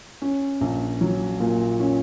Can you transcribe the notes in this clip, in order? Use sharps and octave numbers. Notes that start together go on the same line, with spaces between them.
C#4
A#1
F#3
A#2
C#4